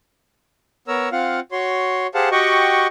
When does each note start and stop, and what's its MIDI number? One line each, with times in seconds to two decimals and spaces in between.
0.88 1.09 59
0.88 1.09 70
0.88 1.09 73
0.88 1.09 82
0.88 1.09 88
1.12 1.40 60
1.12 1.40 65
1.12 1.40 77
1.12 1.40 78
1.52 2.07 66
1.52 2.07 73
1.52 2.07 84
2.14 2.29 67
2.14 2.29 68
2.14 2.29 72
2.14 2.29 77
2.14 2.29 78
2.14 2.29 81
2.32 2.87 66
2.32 2.87 67
2.32 2.87 75
2.32 2.87 78
2.32 2.87 79
2.32 2.87 85